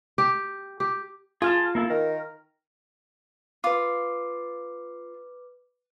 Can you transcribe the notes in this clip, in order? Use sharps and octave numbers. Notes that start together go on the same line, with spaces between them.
G4
G4
F4 G#4 F5 A5
A#3 E4 A4
D#3 A#4
F4 B4 D6